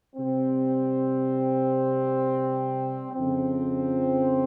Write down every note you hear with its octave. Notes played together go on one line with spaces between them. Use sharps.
C3 G3 C4
F2 C#3 F3 C4